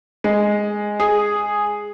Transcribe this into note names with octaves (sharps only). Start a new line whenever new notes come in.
G#3
G#4